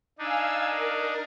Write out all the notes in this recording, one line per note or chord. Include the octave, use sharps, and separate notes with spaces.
D4 D#4 F5 G#5 E6
A#4